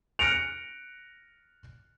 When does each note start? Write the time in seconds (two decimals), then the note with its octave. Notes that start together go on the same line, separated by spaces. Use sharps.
0.19 F6 F#6 A#6 C#7 D7 F7